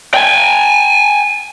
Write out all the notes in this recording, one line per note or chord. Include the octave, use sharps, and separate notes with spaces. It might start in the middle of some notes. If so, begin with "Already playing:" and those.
G5 G#5